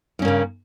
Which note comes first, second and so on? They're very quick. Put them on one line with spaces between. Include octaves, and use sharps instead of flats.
G2 C#4 A#3 C#3